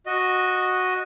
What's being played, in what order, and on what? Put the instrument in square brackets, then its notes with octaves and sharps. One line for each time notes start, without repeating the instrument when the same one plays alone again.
[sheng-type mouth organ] F#4 D#5